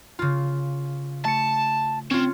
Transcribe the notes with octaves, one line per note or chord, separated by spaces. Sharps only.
C#3 F4
A3 A5 C#7
C4 C#4 F4